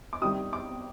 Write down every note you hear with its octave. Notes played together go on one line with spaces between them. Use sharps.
D6
C3 D#3 G3 D#6
D6